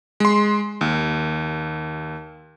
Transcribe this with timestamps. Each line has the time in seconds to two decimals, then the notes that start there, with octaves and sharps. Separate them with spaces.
0.20 G#3 C6
0.81 D#2